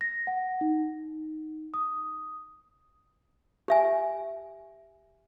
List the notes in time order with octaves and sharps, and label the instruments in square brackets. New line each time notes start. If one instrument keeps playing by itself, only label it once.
[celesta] A#6
F#5
D#4
D#6
[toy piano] G4 E5 G#5